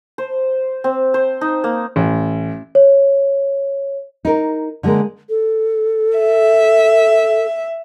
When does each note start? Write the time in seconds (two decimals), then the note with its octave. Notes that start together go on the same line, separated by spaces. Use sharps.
0.18 C5
0.84 C4
1.14 C5
1.41 D#4
1.64 A#3
1.96 A1
2.75 C#5
4.25 D#4 A#4
4.83 D3 G3 G#3 A#3 A#4
5.29 A4
6.18 E5